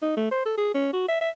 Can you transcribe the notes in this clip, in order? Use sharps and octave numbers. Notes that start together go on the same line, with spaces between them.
D#4
A3
C5
A4
G#4
C#4
F#4
E5
E5